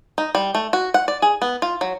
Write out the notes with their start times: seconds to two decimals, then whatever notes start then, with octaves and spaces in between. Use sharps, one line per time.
0.18 D#4
0.35 G3
0.55 A3
0.73 F#4
0.94 F#5
1.08 D5
1.22 G#4
1.42 B3
1.62 F4
1.81 F#3